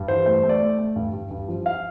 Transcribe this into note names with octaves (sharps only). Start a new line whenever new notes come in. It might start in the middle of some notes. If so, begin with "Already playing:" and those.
Already playing: G2
E3 C5
A3 C5
A3
D5
A3
A3
G2
G2
G2
F3
F5